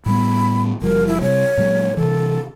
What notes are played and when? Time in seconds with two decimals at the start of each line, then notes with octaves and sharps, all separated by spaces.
0.06 A2 G3 B3 B5
0.82 F#1 F3 G3 A#4
1.07 E4
1.21 C3 G3 C#5
1.58 A#2 F#3 G#3
1.97 C3 E3 A4